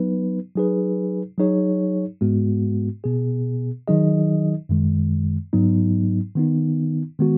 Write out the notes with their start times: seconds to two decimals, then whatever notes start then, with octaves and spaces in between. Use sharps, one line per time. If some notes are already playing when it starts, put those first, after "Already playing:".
Already playing: F#3 B3 D#4 B4
0.56 F#3 D#4 G#4 B4
1.38 F#3 D#4 G#4 C#5
2.21 G#2 G#3 B3 F#4
3.04 B2 B3 G#4
3.87 D#3 F#3 D#4 G#4 D#5
4.69 F#2 D#3 G#3
5.53 G#2 F#3 B3 D#4
6.36 D#3 B3 D#4
7.19 D#3 G#3 B3 F#4